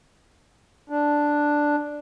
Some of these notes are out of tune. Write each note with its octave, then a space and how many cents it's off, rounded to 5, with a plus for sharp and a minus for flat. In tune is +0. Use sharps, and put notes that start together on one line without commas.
D4 +0